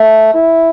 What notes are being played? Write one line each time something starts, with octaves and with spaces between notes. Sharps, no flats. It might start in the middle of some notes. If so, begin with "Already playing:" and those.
Already playing: A3
E4